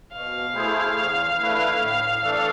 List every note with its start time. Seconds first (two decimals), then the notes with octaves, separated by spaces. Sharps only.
0.12 B2 F5
0.55 A3 E4 G#4 C5
0.96 E2
1.38 D3 A3 E4 B4
1.80 A2
2.22 E3 A3 D4 A4